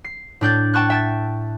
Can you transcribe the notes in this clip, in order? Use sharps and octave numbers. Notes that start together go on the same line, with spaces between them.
C7
A2 D4 G6 A6
G5 A5 C#6 F#6
E5 G5 A5 A6